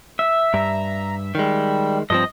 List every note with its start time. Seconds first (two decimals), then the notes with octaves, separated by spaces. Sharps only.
0.19 E5
0.54 G2 A#5
1.35 D#3 G3 G#3
2.10 G2 F3 C4 D#5